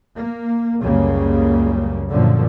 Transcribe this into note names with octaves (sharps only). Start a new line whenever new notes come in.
A#3
C#2 F#2 C#3 G3 A#3
F#2 A#2 D3 F3